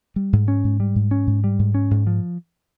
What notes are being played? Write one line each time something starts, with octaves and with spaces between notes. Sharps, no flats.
G3
G#2
C#4
G#2
G3
G#2
C#4
G#2
G3
G#2
C#4
G#2
F3